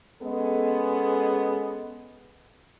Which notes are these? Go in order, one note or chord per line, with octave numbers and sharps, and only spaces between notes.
G#3 B3 C#4 G#4 A4 D#5